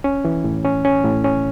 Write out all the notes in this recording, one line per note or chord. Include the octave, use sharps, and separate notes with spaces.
C#4
E3
A2
C#4
C#4
A2
C#4